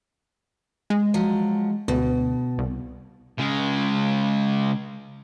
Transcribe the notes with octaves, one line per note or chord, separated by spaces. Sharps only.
G#3
F3 F#3
D2 B2
C2
C#3 G#3